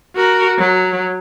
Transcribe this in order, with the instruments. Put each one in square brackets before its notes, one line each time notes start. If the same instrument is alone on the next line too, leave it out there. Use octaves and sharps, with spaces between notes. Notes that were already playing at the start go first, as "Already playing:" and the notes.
[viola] F#4 A#4
F#3